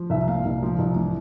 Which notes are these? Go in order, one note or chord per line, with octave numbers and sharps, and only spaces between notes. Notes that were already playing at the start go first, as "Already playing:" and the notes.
Already playing: F3
C2 E5
A#2 F5
C2
F3
C2
E3